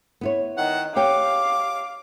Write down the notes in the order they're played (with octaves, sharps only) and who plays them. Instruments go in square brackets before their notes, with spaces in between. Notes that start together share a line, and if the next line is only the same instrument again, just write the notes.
[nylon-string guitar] B3 E4 C#5
[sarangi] D#3 [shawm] F#5
[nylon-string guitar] G4 C#5 G5 [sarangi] F5 [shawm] D6